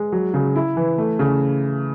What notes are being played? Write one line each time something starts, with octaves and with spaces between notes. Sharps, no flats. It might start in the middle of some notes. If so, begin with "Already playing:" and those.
Already playing: G#3
F#3
C#3
E4
E3
A3
C#3